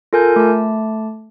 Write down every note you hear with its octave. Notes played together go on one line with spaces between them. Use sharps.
F4 A4 A#4 G#5 G6
A3 A5